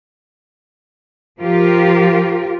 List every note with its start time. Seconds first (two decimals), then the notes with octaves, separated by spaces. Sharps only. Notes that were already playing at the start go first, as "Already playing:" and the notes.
1.40 F3 F4 G4 A#4